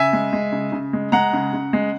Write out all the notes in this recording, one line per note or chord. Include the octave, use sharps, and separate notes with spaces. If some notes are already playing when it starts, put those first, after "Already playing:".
Already playing: C#3 E5 G#5
G#3
G#3
C#3
C#3
G#3
G#3 F#5 A#5
C#3
C#3
G#3